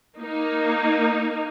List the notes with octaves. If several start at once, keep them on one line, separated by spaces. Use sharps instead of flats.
A#3 D#4